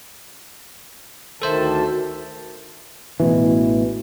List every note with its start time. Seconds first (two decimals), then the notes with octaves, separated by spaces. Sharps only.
1.42 D2 D#3 A4 C5 E5 A5
3.20 A1 B2 E3